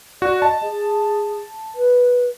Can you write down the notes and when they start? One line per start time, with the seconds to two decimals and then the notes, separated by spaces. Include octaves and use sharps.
0.22 F#4 D5
0.42 D#5 A5
0.62 G#4
1.75 B4